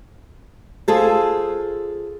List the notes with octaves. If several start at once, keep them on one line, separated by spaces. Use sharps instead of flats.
F4 G#4 A4 C5